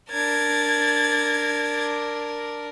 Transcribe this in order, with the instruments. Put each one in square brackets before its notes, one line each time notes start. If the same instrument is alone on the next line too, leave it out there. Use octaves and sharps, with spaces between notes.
[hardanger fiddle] D4 A#4 [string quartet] G#6 A6